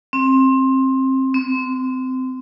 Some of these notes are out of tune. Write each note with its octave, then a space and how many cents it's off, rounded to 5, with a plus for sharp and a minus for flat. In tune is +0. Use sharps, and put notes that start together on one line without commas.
C4 +20
C4 -20